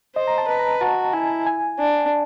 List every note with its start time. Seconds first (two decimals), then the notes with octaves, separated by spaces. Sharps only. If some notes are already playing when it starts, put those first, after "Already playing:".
0.15 C5 D#5
0.28 A#5
0.38 A5
0.48 B4
0.59 A#5
0.81 F#4 A5
1.13 E4 G#5
1.47 G#5
1.78 D4